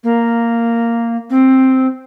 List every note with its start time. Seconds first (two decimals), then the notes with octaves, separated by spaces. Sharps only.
0.03 A#3
1.30 C4